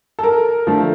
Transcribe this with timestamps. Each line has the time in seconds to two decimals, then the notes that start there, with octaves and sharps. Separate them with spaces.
0.19 A4
0.23 A#4
0.67 D3 F3 A3